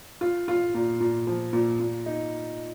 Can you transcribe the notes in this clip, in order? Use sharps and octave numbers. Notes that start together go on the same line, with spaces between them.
F4
F4
A#2
A#2
F3
A#2
A#2
D#4